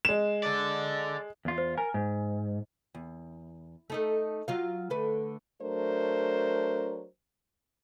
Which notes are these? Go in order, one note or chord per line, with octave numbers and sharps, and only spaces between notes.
G#3 E7
A4 D5
E2 F4
C5
A#4 G#5
G#2
E2
A3 D#4 A4
F#3 F4 F5
D3 A3 B4
F#3 A3 D4 A#4 C5